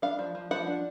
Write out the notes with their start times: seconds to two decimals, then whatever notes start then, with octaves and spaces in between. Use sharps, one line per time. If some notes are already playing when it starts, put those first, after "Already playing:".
0.02 D4 F5
0.19 F3
0.35 F3
0.51 F3 F#5
0.67 D4